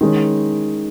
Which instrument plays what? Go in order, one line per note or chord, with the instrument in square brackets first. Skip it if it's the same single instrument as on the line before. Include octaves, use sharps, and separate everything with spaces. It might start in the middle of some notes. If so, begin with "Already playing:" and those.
[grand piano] D#3 G#3 C#4